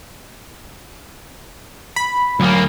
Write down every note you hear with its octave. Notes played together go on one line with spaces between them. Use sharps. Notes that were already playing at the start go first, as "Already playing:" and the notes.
B5 B6
D2 F#3 A#3